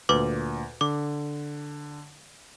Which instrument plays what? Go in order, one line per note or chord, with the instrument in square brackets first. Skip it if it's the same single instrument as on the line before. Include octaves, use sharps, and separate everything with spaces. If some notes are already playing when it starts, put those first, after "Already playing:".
[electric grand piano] D2 A#2 [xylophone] B4 D6
[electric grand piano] D3 [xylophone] D6